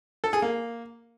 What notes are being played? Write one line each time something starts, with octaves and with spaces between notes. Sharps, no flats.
A4
G#4
A#3